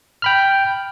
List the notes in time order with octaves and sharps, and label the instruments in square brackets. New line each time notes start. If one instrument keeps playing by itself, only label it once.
[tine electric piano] G5 B5 F6